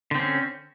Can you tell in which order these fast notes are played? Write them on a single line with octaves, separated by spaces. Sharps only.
D3 C4 C#4